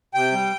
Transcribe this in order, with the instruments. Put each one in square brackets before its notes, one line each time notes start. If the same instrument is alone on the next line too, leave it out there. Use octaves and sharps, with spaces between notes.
[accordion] C3 G5
G3